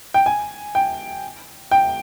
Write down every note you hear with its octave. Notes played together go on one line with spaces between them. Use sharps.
G5
G#5
G5
G5